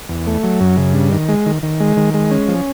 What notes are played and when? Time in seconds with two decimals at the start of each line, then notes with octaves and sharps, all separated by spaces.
0.09 E2
0.27 A3
0.44 F#3
0.61 F#2
0.77 C#3
0.94 G2
1.12 D#3
1.29 G#3
1.46 D#3
1.63 D#3
1.80 G#3
1.97 D#3
2.14 G#3
2.31 C#4
2.48 F3